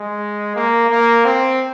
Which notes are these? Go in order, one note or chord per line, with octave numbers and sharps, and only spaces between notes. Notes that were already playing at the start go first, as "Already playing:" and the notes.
Already playing: G#3
A#3
A#3
C4